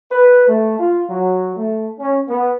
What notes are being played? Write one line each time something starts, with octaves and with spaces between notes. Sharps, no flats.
B4
A3
F4
F#3
A3
C#4
B3